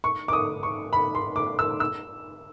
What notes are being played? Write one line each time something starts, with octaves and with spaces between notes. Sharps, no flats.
C#6
D6
D#6
C#6
B5
C6
D6
E6
E6